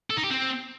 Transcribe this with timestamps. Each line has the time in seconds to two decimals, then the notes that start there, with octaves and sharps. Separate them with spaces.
0.10 A4
0.17 D#4
0.24 G4
0.31 C4